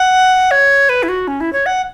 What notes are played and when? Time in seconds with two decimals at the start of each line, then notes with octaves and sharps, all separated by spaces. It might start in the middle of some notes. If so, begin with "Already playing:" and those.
Already playing: F#5
0.51 C#5
0.89 B4
1.03 E4
1.09 F#4
1.28 C#4
1.41 E4
1.53 C#5
1.66 F#5